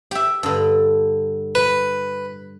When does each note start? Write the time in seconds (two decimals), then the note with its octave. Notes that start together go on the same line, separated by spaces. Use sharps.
0.11 G4 E5
0.43 G2 D3
1.55 B4